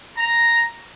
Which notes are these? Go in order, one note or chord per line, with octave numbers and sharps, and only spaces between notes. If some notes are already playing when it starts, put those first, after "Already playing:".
A#5